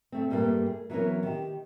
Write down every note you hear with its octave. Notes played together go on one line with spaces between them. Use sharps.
A3 C4
G2 G3 A3 A#3
G#4
E3 F#3 B3 C#4 A#4
D#3 G4